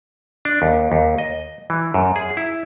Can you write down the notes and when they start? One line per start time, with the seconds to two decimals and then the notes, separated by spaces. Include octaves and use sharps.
0.45 D4
0.62 D#2
0.92 D#2
1.18 D#5
1.70 E3
1.94 F#2
2.16 G#4
2.37 E4